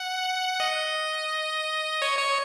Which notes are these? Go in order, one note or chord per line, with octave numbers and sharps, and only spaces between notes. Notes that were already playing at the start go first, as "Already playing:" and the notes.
Already playing: F#5
D#5
C#5
C#5